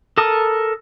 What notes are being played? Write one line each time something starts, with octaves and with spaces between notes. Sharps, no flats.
A4 A#4 A5 D#6